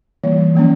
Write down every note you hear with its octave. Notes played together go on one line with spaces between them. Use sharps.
E3 G3 A#3
F3 A#3 C#4